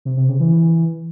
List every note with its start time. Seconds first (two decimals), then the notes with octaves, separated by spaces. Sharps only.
0.05 C3
0.17 C3
0.28 C#3
0.40 E3
0.52 E3